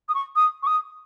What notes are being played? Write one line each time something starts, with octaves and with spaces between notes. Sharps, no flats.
D#6
C#6
D#6
C#6
D#6